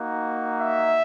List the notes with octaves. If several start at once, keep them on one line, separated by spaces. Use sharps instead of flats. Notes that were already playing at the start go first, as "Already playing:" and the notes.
Already playing: A#3 D#4 F#4
E5